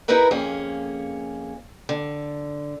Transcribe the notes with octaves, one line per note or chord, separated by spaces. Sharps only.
D#4 E4 G#4 A#4 B4 E5
F2 A#3 C#4 G#4
D3